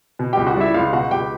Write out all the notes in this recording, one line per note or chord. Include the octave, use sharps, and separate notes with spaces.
B2
C#2 G4 G5
F#4 F#5
G3 E4 E5
C#2 F4 F5
B2 F#4 F#5
C#2 G4 G5